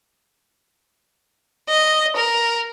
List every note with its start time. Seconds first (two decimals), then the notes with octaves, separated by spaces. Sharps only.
1.70 D#5
2.16 A#4